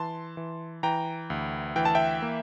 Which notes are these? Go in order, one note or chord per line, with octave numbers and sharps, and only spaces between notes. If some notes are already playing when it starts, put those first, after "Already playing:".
Already playing: E3 A5 C6
E3
E3 G5 A#5
D2
E3 G5
A5
E5 G5
A#3